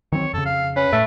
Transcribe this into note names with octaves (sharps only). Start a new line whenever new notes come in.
D#3 F#3 C4 C#5
F2 C#3 A4
F5
C#4 B4
A2 A3